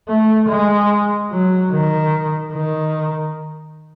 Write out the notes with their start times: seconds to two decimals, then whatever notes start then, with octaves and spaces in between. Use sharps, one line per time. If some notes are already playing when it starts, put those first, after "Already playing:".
0.08 A3
0.49 G#3
1.31 F#3
1.72 D#3
2.54 D#3